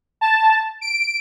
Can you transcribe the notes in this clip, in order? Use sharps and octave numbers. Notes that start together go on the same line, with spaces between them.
A5
D7